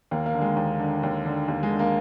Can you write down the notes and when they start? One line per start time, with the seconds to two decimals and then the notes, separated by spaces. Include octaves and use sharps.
0.11 D#2 A#3
0.26 A#3
0.34 D3
0.41 G#3
0.57 D#2
0.80 D3
1.03 D#2
1.25 D3
1.48 D#2 A#3
1.63 G#3
1.70 D3
1.79 A#3